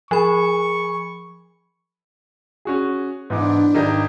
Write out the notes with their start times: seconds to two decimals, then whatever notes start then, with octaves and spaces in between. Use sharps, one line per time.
0.11 F3 G#4 B5 C#6
2.65 C#4 F#4 G#4
3.30 G#2 E3 B3 D4 D6
3.74 G#1 D#4 G4 D5